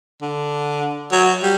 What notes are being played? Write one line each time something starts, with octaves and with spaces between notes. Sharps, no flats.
D3
F#3
G3